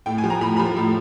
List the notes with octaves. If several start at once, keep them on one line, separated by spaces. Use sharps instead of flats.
A2 G5
G#5
F3
A#5
A2 B5
F3 B5
A2